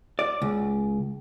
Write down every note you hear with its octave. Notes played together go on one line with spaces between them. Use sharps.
D5
C#2